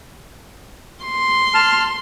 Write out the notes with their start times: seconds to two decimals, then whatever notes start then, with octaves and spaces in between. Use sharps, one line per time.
1.05 C6
1.54 A5 F6